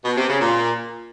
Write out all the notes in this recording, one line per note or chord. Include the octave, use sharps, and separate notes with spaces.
B2
C3
C#3
A#2